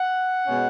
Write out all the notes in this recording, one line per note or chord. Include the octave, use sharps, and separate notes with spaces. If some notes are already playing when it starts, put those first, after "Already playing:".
Already playing: F#5
B2 G#3 C#4